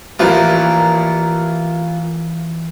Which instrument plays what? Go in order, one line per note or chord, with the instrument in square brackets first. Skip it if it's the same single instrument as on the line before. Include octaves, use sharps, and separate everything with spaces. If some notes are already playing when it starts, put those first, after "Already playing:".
[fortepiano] A1 F3 B4 [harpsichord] E3 [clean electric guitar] F4 A#4